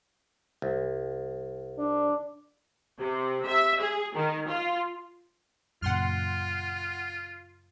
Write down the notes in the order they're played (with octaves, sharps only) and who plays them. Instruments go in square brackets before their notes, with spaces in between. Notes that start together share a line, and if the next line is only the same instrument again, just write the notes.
[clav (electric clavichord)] C2
[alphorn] D4
[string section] C3
E5
G#4
D#3
F4
[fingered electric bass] F#2 A#2 C#3 [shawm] F4 [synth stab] F#5 C6 F6